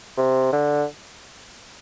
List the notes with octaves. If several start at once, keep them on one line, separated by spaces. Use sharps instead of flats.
C3
D3